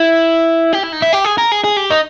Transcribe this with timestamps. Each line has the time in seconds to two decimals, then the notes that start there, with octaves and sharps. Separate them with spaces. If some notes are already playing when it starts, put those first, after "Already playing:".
Already playing: E4
0.73 G4
0.83 E4
0.92 D#4
1.02 E4
1.13 G4
1.25 G#4
1.38 A#4
1.52 G#4
1.64 G#4
1.77 G4
1.91 D#4